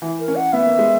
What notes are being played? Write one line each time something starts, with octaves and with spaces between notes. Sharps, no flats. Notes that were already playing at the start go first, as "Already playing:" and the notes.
E3
A#4
C#4
F#5
B3 E5
A#3
G#3